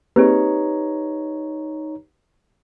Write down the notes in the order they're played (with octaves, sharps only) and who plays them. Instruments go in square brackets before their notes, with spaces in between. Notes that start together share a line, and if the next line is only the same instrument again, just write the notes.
[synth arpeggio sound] A#3 C4 G#4 [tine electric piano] D#4 C#5 A#5 [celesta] G4 B4